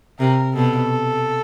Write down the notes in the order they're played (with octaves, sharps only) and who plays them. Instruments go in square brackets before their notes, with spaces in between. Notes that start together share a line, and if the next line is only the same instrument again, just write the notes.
[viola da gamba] C3 [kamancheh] A#4
[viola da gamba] B2 [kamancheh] A4